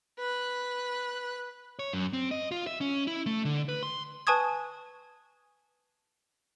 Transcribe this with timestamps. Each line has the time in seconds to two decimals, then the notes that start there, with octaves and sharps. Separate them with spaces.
0.19 B4 F#6
1.79 C#5
1.93 F#2
2.13 C4
2.31 D#5
2.51 F4
2.67 E5
2.81 C#4
3.07 E4
3.26 A3
3.45 D3
3.69 B4
3.83 C6
4.27 B4 G#5 A5 C#6 D#6 G#6